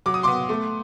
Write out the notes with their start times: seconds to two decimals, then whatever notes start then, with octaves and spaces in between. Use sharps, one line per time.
0.06 F#3 D6
0.14 D#6
0.23 B3 C6 D6
0.49 A3